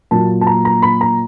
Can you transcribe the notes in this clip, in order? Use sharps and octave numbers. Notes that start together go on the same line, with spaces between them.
A#2 F#3 A#3 A5
A5
A#5
A#5
B5
A#5